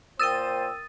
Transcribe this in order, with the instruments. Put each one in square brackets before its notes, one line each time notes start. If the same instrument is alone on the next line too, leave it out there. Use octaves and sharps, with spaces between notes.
[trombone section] A#2 C5 [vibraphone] A#4 G5 [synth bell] D#6 A6 D#7 [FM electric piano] E6